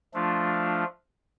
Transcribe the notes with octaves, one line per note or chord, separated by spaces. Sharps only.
F3 A3 D4 F4